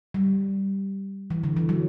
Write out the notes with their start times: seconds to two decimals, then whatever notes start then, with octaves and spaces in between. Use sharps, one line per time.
0.14 G3
1.30 E3
1.44 D3
1.56 E3
1.69 F#3